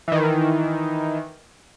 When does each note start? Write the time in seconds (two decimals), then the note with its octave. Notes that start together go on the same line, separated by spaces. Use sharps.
0.08 D#3 E3